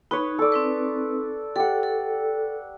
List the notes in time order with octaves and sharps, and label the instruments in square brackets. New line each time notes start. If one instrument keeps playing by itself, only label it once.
[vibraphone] D#4 [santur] B4 C#5
[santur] A4 D5
[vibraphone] C4 D#4 B4
[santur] G4 F#5 [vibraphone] A4
[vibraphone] A4